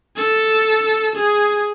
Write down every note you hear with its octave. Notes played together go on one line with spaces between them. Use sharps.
A4
G#4